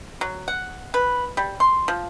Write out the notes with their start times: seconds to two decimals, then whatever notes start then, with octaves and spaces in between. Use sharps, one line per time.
0.21 F#3
0.48 F#5
0.94 B4
1.37 G3
1.60 C6
1.88 F3